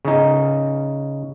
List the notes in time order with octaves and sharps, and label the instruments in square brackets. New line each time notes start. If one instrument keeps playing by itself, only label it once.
[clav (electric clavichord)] C#3 D#4